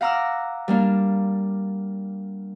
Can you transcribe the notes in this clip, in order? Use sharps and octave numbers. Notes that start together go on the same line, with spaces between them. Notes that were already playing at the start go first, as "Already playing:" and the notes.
F5 F#5 A#5 D6 E6 F6
G3 A#3 D4 F5